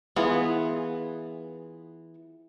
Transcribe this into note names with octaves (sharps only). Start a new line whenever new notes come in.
E3 B3 F4 G#4